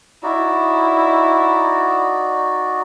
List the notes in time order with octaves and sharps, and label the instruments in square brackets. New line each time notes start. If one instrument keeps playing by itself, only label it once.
[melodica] D#4 F#4 D5 [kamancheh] E4